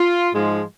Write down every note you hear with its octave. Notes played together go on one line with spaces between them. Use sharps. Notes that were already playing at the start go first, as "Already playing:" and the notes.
Already playing: F4
G#2 F3 G#3